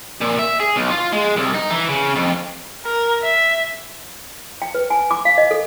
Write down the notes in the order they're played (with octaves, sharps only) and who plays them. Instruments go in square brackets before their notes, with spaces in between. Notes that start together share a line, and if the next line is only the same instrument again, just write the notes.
[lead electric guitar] A#2
E5
G#4
B1
F4
G#3
C2
D#4
E3
C#3
F2
[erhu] A#4
E5
[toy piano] G5
B4
G#5
D6
F5
D#5
A4